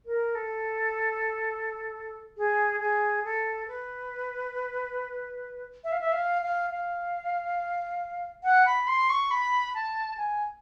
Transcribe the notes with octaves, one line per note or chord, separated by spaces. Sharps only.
A#4
A4
G#4
G#4
A4
B4
E5
F5
E5
F5
F5
F5
F#5
B5
C6
C#6
B5
A5
G#5